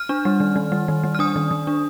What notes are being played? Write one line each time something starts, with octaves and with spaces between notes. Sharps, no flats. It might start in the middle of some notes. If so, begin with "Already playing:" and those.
Already playing: F6
D4
G3
D#3
D#3
G3
D#3
G3
F6
D4 D#6
D#3
D#3
D4